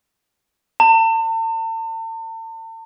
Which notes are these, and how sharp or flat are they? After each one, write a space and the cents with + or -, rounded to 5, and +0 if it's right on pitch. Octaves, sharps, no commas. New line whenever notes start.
A5 +40